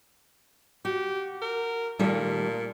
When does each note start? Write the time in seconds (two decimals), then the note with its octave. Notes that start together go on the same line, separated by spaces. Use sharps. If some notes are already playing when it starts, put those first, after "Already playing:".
0.85 F#4 G4
1.42 A#4
1.99 A#2 D#3 G3 A3